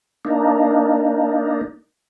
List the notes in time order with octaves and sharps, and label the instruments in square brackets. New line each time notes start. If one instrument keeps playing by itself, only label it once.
[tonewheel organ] A#3 D4 D#4